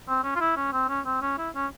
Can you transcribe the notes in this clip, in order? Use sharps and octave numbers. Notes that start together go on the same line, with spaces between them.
C4
C#4
F4
E4
C#4
C4
C#4
C4
C#4
E4
C#4